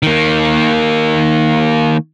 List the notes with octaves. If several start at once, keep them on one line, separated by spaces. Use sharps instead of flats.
D#3 A#3